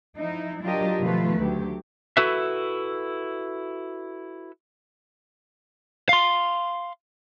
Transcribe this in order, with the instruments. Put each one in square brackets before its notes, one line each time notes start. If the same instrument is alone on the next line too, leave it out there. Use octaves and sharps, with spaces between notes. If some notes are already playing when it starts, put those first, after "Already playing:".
[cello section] F3 D#4 E4
F#3 D4 F4 G4 A#4 D#5
B2 D#3 F3 A3 F4 B4
D2 F#3 G4
[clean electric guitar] E4 F#4 A4 B4 E5
[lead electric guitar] F5 C6